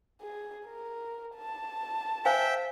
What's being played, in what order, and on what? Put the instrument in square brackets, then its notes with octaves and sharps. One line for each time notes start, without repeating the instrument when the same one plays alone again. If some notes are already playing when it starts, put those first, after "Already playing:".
[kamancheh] G#4
A#4
A5
[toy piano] C5 F5 G#5 [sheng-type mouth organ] E5 G5